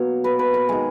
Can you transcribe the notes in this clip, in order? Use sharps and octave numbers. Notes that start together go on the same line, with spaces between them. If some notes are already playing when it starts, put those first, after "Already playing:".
Already playing: B2 F#3 A#3 C#5
B4
B4
A#4
D#3 G#3 G#4